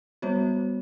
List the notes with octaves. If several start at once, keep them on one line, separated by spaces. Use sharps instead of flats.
G3 B3 F#4 C#5